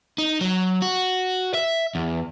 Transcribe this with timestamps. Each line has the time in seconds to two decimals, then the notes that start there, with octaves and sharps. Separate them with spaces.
0.18 D#4
0.41 F#3
0.82 F#4
1.54 E5
1.95 E2